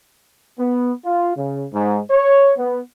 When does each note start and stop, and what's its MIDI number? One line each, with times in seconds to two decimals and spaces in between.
0.59 0.91 59
1.05 1.33 65
1.37 1.65 49
1.73 1.99 44
2.10 2.51 73
2.57 2.80 59